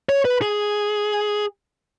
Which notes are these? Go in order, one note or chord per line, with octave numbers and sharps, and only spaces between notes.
C#5
B4
G#4